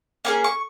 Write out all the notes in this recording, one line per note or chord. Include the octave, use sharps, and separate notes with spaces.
A#3 C#4 G#4 G#5
C#6